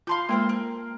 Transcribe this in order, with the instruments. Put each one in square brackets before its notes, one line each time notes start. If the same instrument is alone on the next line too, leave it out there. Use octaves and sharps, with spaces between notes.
[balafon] F4 A5 B5 [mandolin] F5 C6 G6
[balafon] G#3 A#3 G5 [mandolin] A4 A#4 C5
[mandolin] A#4